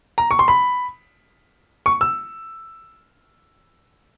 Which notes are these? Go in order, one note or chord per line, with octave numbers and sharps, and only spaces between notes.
A#5
C#6
C6
B5
C#6
E6